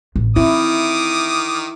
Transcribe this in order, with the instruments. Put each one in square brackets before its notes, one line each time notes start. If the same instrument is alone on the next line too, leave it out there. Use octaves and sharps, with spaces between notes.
[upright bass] A1
[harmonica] D#3 D6 D#6 [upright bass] C4 [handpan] E4